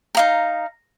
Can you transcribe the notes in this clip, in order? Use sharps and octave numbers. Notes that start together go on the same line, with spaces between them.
D#4 F5 A#5